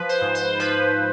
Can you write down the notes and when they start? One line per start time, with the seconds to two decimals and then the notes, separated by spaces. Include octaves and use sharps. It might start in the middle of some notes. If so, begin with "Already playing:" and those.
Already playing: F3 B4
0.09 C5
0.21 G#2
0.35 C5
0.60 F3 B4